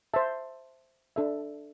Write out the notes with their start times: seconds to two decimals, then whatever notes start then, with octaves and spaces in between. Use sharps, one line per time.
0.14 C5 E5 A5
1.16 D4 A4 E5